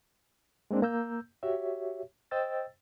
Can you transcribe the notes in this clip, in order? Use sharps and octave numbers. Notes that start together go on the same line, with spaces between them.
G#3 A#3 C4 D4
A#3 A#5 E6 G6
F#4 G4 C#5 E5
C5 D#5 G5 E6 A6